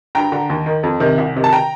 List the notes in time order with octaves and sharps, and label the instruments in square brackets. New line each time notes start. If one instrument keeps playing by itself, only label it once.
[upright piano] G2 G5 A#5
D3
D#2
D#3
F2
C3 D#3
C2
C3 D#3
A5
G5 A#5